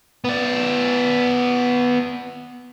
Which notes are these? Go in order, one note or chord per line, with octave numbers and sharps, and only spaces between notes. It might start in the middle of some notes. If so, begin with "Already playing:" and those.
B3 D5